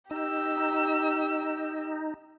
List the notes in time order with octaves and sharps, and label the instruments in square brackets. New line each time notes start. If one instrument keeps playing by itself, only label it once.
[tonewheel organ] D#4 [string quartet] G4 E6